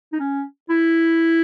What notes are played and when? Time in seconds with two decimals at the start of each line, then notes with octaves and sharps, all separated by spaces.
0.13 D#4
0.20 C#4
0.70 E4